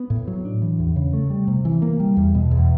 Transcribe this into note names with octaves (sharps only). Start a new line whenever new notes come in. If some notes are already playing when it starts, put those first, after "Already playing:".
Already playing: B3
A2
F#3
D4
E3
E2
C#3
A3
G3
C3
E3
A#3
G3
E2
B2
E2